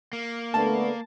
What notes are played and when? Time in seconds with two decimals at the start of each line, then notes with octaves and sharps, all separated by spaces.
0.13 A#3
0.54 D3 A3 B3 A5